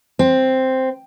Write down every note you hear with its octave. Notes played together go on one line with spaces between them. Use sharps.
C4